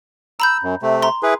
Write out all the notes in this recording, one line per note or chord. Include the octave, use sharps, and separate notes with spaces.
A#5 B5 E6 G6
F#2
C3 A3
A#5 C6
E4 G#4 B4